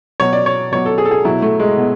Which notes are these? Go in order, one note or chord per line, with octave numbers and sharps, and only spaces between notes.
B2 F#3 C#5
D5
C#5
B2 F#3 C#5
A4
G#4
A4
G#4
B2 F#3 E4
A3
G#3
B2